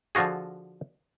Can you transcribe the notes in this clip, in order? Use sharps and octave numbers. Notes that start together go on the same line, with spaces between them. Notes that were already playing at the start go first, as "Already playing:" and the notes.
D3 F3 F4 F#4 G#4